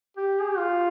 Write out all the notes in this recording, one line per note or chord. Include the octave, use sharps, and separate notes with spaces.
G4
G#4
G4
F4